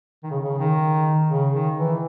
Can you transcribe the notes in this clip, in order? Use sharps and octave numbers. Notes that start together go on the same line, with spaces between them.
D#3
C#3
C#3
D#3
C#3
D#3
E3